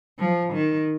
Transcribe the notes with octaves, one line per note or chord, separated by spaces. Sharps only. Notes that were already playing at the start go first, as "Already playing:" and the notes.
F3
D#3